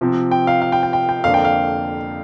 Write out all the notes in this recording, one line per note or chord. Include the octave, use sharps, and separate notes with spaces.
C3 F3 C4
G5
F5
F5
G5
G5
G5
G5
F2 D3 A#3 D4 F5
G5
F5